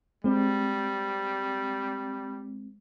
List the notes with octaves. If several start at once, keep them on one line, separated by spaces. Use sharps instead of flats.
G3 G#3 C4